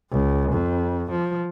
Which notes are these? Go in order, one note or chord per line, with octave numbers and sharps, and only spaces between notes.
C#2
F2
F3